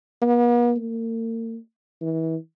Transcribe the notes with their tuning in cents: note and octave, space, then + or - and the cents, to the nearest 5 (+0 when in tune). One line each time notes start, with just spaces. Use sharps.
B3 -45
A#3 -40
E3 -30